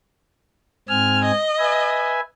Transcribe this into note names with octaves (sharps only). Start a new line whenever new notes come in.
G#2 C4 G#5 F6
D#5
B4 E5 G#5